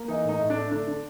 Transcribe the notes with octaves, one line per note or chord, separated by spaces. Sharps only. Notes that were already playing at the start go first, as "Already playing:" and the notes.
Already playing: A#3
E3 D#4
A2 D#4
A2
D4
A3
D3 D4
D3